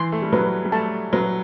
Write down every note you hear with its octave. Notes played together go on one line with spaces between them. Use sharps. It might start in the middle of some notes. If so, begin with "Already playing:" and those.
Already playing: E3 C6
A3
G3
F#3 B4
G3
A3 A5
F#3 B4